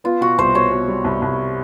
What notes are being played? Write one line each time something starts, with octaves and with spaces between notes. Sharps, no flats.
B3 F4
B2 F#4
C2 C5
B2 C#5
B2
G3
C2
C2